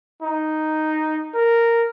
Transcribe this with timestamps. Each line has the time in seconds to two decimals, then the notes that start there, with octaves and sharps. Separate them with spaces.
0.22 D#4
1.34 A#4